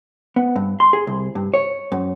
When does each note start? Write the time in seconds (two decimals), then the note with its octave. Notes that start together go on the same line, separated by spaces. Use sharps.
0.36 B3
0.56 G2
0.80 C6
0.93 G#4
1.07 C2
1.35 G2
1.54 C#5
1.92 F#2